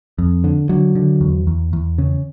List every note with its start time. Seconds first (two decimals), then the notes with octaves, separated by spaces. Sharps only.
0.18 F2
0.44 D3
0.69 D3 F#3
0.95 D3
1.21 E2
1.47 E2
1.73 E2
1.98 C#3